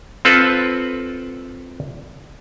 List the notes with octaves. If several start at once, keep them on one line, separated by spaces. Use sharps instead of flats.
C4 F4 A4 B4